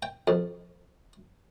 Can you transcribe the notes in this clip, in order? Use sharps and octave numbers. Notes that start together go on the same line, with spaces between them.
G5
F2